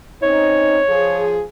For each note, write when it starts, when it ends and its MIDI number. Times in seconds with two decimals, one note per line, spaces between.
0.23 0.80 60
0.23 0.80 61
0.23 0.80 63
0.23 1.37 73
0.89 1.42 53
0.89 1.42 68